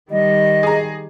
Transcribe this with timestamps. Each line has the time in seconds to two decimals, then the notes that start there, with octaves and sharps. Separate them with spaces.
0.11 D#3 G3 D#5
0.63 G#4 A#5